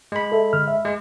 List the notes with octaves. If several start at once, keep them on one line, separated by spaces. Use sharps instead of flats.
G#3 B5
A4 E5
D3 F6
E5
G#3